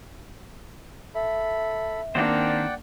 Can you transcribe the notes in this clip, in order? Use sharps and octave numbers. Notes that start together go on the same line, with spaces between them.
A4 E5 B5
D#3 A#3 C4 D4 C5 D5 F#5 G5